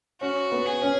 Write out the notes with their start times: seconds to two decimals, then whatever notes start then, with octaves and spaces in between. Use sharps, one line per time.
0.21 C#4 F#4
0.52 B3
0.66 G#4
0.82 C#4